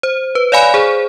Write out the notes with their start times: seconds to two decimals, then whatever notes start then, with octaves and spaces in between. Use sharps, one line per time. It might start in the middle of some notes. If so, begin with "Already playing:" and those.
0.03 C5
0.35 B4
0.52 C#5 D5 F5 G#5 B5
0.74 G#4 C5